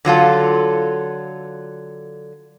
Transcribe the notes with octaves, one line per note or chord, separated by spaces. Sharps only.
D3 F#3 F4 A4